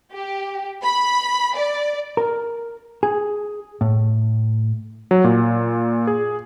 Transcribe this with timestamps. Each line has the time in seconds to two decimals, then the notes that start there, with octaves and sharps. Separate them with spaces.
0.12 G4
0.83 B5
1.56 D5
2.17 A#4
3.03 G#4
3.81 A2
5.11 F#3
5.24 A#2
6.07 G#4